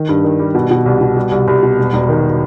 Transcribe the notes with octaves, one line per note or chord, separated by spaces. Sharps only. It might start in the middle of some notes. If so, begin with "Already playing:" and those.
Already playing: D#3
G2
D#3
G3
B2
B2
C2
B2
G3
C2
C2
B2
E1
E1
D#3